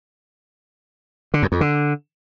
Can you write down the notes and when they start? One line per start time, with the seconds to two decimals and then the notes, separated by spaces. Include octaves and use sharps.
1.34 D3
1.43 F#2
1.52 F2
1.61 D3